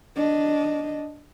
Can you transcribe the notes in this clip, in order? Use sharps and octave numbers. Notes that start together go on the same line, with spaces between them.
D4 D#5